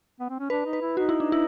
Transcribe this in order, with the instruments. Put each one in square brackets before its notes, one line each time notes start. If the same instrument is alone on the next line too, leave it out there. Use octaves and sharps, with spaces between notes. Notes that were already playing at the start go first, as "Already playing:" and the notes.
[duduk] B3
C4
C#4
[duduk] D4 [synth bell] B4
[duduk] D#4
[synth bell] B4
[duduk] E4
[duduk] D#4 [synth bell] F#4
[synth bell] E4
D4
E4